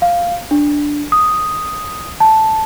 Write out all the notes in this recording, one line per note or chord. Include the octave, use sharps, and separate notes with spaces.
F5
D4
D#6
A5